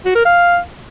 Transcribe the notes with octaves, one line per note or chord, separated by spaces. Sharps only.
F#4
A#4
F5